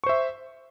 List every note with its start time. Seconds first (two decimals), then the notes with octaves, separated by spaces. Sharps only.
0.04 C#6
0.06 C5
0.09 E5